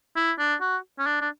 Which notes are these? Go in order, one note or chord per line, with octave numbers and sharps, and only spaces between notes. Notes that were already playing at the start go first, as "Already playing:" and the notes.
E4
D4
F#4
C#4
D4
D4